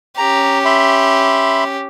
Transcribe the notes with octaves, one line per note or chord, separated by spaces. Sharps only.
C#4 G4 A#5
E5 B5 C6